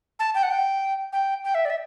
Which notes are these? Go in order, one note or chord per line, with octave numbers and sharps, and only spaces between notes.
A5
G5
F#5
G5
G5
G5
E5
D5
E5